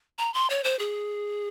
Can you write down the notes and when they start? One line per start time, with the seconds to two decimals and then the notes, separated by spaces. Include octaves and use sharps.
0.19 A#5
0.34 C6
0.50 C#5
0.64 C5
0.79 G#4